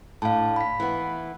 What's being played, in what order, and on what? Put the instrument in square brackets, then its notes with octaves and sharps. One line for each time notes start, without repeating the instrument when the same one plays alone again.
[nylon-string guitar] A2 D4 [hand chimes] F5 A5
[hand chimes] B5 B6
[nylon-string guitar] E3 B3